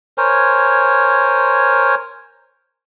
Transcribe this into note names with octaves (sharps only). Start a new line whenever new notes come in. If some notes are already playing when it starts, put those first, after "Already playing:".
A#4 C5 C#5 G#5